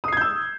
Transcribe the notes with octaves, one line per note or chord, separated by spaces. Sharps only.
D#6 E6 G6 G#6 C7